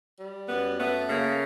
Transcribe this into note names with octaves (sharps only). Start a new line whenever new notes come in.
G3
F#2 B3
A3 B3
C#3 A#3